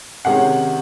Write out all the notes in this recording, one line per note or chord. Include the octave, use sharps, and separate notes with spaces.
C3 D#3 G#3 C#4 F#5